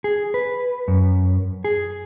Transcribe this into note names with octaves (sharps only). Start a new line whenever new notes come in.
G#4
B4
F#2
G#4